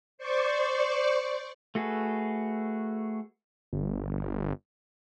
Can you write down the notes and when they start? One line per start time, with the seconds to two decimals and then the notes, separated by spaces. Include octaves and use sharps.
0.18 C5 D5 C#6
1.75 A3 F#4 G#4 A4 B4
3.73 G1